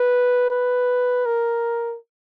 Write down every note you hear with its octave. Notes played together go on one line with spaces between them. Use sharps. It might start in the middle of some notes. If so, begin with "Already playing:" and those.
Already playing: B4
B4
A#4